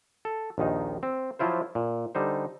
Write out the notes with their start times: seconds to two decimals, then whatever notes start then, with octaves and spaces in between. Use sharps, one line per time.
0.25 A4
0.58 A#1 D#2 D#3 D#4
1.03 C4
1.39 F3 F#3 E4 F4 C5
1.75 A#2
2.15 D3 G3 D#4 C5